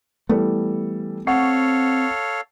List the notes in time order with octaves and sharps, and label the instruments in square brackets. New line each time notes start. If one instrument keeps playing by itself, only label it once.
[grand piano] E3 G3 A4 [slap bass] A3 B3
[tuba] C4 [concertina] A4 C#5 F5 [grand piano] F#5 C#6 C7